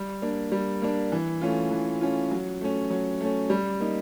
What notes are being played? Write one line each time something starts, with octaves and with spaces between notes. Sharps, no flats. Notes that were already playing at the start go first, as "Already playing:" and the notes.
Already playing: G3
A#3 D4
G3
A#3 D4
E3
A3 C#4 F4
E3
A3 C#4 F4
F#3
A3 C#4
F#3
A3 C#4
G3
A#3 D#4